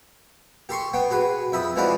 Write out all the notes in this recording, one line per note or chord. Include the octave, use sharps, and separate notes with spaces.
G4 A4 C6 C#6
B3 G5
F#4 G#4 B4
F2 E5 B5 D#6
E3 F3 G#3 F#4 B4 D5